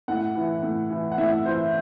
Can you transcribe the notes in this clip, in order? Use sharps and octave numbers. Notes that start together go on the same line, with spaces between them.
A2 F#5
E3
A2
E3
F#5
A2 E5
E3 C5